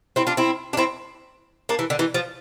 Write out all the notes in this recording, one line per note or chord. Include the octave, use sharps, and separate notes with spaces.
C4 E4
D4 F4
C4 E4
D4
C4 E4
A#3 D4
E3
D3
E3
F3